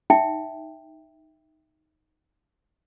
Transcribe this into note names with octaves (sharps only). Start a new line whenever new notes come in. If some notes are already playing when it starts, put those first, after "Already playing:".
D#4 E5 G5